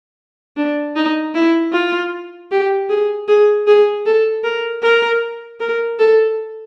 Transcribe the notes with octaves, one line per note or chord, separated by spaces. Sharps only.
D4
D#4
E4
F4
G4
G#4
G#4
G#4
A4
A#4
A#4
A#4
A4